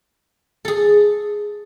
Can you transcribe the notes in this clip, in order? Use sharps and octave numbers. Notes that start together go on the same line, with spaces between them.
G#4 A4